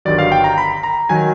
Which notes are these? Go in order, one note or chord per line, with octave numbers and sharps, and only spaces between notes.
G1 G2 D#3 F#3 D5
F5
G5
A#5
B5
A#5
D#3 F#3 G#5